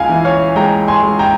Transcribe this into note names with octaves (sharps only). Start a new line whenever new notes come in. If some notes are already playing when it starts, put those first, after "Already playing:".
Already playing: C#2 F5 G#5
E3
C#5 F5
G#3 G5 A#5
G#5 C6
G#3
G5 A#5